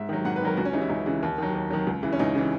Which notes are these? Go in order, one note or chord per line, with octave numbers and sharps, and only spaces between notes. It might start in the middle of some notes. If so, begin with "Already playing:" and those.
Already playing: G#2 E5
D#3 F#3
G#2 F#5
B4
D#3 F#3 A#4
C#2 F#4
C#4
C#3 E3 D#4
E4
C#2 D#4
C#3 E3
D#2
D#3 F#3
D#2
D#3 F#3
C#2
C#3 E3
C#4
C#2 D#4
C#3 E3